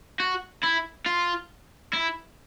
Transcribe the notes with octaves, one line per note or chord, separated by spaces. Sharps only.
F#4
E4
F4
E4